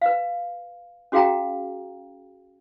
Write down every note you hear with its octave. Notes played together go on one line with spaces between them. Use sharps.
B4 F5
C#4 F#4 G#4 F5 G5 A#5